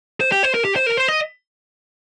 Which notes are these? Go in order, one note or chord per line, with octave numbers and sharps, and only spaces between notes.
C5
G4
C5
A#4
G4
C5
A#4
C5
D#5